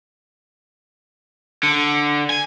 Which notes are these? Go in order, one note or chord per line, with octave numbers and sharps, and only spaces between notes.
D3
G#5